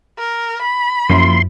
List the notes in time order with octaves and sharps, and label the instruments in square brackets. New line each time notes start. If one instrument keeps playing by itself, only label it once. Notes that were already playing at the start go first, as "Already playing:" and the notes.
[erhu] A#4
B5
[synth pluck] F#2 [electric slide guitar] F3 A#3 E4 [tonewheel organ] C6